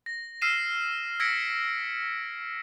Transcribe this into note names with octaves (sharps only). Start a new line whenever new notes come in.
A#6
E6 F6 C7 D#7 E7
E6 G#6 A#6 B6 C#7 D7